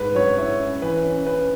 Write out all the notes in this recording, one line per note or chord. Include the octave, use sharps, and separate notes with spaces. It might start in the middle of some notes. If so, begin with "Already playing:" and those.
Already playing: G#2 B4
F#3 C#5
E4 C#5
C#4
E3 B4
C#4
C#4 B4